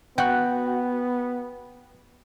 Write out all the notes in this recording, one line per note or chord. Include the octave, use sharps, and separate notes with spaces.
B3 F#4 G5 F#6